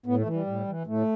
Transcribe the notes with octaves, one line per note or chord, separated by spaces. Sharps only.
A2 B3
A3
E3
G3
A2
E3
A2 A3